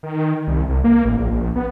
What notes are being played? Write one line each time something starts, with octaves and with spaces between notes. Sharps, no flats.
D#3
C2
C2
A#3
A1
A#1
A#1
B3